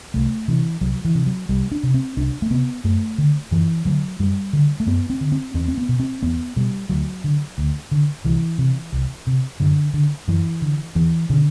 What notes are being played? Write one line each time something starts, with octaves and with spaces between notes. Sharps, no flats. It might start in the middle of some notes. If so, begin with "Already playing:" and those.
C2 A3
C3 E3
C2 F#3
E3
C3
F#3
C2 G3
D4
C3
C4
C2 D4
A3
C3 B3
F#2 A3
D3
F#2 E3
D3 F#3
F#2 G3
D3
A3
F#2 B3
C4
D3
C4
E2 C4
C4
B3
B2
C4
E2 B3
B2 G3
D2 F#3
D3
D2
D3
C2 E3
C3
C2
C3
F#2 D3
D3
F#2 E3
D3
E2 E3
B2 D3